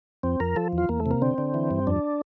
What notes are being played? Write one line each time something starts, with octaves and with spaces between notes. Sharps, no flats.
F2 C4
F2 A#4
F3 A4
E2
F4
E2 A#3
A3
C3
A#3
D3 C4
D3
E3
G2
F2 D4